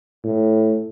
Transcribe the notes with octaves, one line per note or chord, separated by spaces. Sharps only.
A2